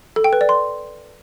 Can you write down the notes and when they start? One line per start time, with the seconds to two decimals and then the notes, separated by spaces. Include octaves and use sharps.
0.16 A4
0.24 G5
0.33 B4
0.41 D5
0.49 C6